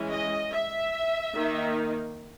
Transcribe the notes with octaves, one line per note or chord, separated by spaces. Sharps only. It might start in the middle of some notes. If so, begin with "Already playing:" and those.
Already playing: E3 G#3 C#4
D#5
E5
D#3 A#3 D#4